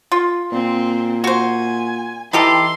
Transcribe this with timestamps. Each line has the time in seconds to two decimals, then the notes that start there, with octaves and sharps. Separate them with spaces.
0.12 F4
0.52 A#2 C4
1.24 F#4 C5 G#5
2.33 E3 D#4 G4 A4 C6